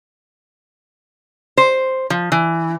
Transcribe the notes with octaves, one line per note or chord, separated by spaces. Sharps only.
C5
F3
E3